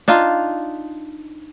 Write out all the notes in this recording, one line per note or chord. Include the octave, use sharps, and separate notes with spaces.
D4 D#4 F4